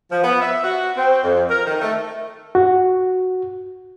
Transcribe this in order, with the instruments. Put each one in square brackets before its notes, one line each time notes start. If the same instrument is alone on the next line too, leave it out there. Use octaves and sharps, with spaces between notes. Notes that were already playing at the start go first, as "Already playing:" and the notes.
[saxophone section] F3
B3
E5
F#4
C4
F2
A#4
D#3
A3
[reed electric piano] F#4